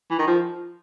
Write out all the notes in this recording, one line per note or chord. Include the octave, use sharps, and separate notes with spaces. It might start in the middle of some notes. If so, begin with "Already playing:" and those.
E3
D#3
F3